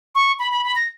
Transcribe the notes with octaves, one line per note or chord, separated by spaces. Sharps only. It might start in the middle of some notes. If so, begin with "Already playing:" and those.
C#6
B5
B5
B5
A#6